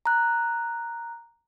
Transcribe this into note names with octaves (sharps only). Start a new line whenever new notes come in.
A#5 F#6